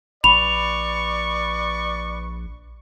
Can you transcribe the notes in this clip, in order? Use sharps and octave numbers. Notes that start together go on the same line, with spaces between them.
A#1 B4 D5 B5 C#6 F7